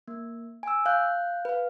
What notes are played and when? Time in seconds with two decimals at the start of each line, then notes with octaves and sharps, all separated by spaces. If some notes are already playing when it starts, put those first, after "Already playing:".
0.08 A#3
0.63 G#5 E6
0.86 F5 F#6 G6
1.45 B4 F5